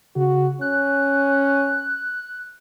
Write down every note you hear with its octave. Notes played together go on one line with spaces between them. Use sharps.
C#3 F#4
C#4 F#6